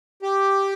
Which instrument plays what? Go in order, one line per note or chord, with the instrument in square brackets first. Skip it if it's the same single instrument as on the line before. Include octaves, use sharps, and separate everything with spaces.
[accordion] G4